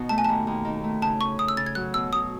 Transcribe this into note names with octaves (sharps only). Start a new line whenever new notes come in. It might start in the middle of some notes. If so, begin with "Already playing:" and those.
Already playing: B2 D#4
A3 A5
G#5
D#2 A5
D#2
D#3
A3
C#3 A5
C#4 C#6
C#3 D#6
E6
C#3 A6
G#6
F#3 F#6
B2 E6
F#3 D#6